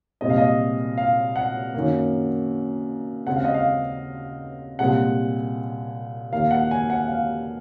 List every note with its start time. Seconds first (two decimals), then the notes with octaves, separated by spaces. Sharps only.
0.21 C2 A#2 G#3 C4 D#5
0.30 F5
0.38 D#5
0.97 F5
1.36 F#5
1.74 F#2 D#3 A#3
3.27 D#2 C#3 G#3 C4 F#5
3.36 F5
3.45 D#5
3.54 F5
4.79 C2 A#2 G#3 C4 F#5
6.32 D#2 D#3 A#3 F5
6.51 F#5
6.71 G#5
6.90 F#5
7.08 F5